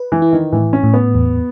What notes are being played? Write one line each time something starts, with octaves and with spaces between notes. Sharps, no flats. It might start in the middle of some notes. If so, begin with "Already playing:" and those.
Already playing: B4
E3
E4
D#3
A2 E3
C#4
A2
B3
E2